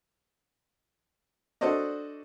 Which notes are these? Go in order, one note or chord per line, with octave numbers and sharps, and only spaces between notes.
D4 F#4 A4 C5 D5 D#5